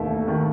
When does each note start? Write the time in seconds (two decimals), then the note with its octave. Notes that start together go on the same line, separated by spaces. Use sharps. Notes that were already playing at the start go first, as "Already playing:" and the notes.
Already playing: E1 D#2 D#3 A3 E5
0.11 A3
0.28 D#3